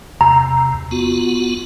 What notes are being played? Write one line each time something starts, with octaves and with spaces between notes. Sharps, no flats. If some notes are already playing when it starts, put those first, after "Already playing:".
E2 C3 A#5
B3 F4 F#4